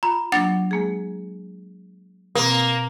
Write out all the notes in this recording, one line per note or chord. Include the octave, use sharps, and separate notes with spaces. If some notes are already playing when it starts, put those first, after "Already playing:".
F4 A#5 B5
F#3 A#3 D4 F#5 A6
G#3 A#3 G#4
B2 A#3 C4